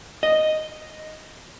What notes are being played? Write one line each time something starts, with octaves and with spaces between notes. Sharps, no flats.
D#5